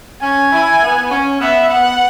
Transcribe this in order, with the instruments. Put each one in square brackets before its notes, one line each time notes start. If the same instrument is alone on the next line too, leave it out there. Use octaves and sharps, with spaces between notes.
[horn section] C#4 [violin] G#5
[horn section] E4
B3
C#4
[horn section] B3 [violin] E5
[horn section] B3 [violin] F#5